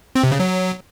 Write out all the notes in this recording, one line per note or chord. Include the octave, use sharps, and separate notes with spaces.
C4
C3
C#3
F#3